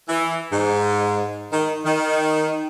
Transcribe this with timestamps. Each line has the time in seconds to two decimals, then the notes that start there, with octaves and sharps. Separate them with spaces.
0.09 E3
0.51 G#2
1.52 D#3
1.85 D#3